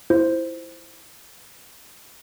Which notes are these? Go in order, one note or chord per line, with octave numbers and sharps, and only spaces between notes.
E4 F4 C5